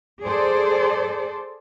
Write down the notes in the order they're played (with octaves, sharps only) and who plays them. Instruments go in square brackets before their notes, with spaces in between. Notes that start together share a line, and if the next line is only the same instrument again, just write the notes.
[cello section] G#4 A4 C5 D5